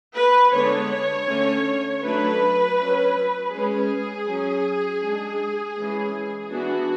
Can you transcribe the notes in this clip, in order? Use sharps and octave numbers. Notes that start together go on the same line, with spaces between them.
B4
D3 G#3 B3 D4 C#5
D3 A3 C#4
F#3 A3 D4 B4
F#3 C#4
G#3 C#4 G#4
F#3 C#4
G#3 D4
E3 G#3 C#4
E3 B3 D4 F#4